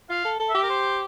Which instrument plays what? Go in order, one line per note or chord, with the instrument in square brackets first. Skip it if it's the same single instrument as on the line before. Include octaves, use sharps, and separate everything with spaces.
[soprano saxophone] F4 [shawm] F5
[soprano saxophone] A4
A4
[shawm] E5
[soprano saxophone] G4
[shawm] A#4
C5